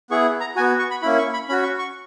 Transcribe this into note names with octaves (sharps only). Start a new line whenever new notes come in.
B3 E4 G#4 C#6
A#5
B3 F#4 G#5
C#6
B5
A#3 C#4 E4 B5
C#6
B5
C#4 F#4 B5
C#6
C#6